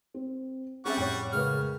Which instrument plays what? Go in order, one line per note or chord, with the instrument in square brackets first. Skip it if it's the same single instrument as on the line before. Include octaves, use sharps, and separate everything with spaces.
[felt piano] C4
[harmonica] G3 F#5 C#6 [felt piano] C4 [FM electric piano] C#4 G#4 E5
[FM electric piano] F2 A2 [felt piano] C#5 G5
[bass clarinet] C#3 [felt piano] G#3 A#4 B4 [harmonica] F6